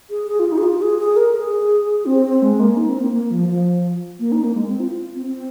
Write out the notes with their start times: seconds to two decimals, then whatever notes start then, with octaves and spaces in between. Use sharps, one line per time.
0.10 G#4
0.27 G#4
0.40 F4
0.52 D#4
0.58 G#4
0.63 F4
0.82 G#4
0.99 G#4
1.16 A#4
1.35 G#4
2.06 C4
2.42 G#3
2.60 A#3
2.77 D#4
2.89 C4
3.01 A#3
3.12 A#3
3.31 F3
3.49 F3
4.20 A#3
4.32 D#4
4.44 A#3
4.55 G#3
4.68 C4
4.80 F4
4.91 F4
5.15 C4
5.26 C4